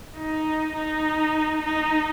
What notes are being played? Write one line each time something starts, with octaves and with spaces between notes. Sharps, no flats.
D#4
D#4
D#4